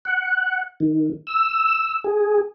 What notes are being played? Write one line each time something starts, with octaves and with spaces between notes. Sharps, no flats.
F#5
D#3
E6
G#4